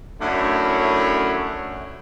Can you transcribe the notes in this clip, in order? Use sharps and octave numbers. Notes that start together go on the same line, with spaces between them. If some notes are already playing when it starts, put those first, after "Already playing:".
F#2 A3 C#4 D4 E4 C#5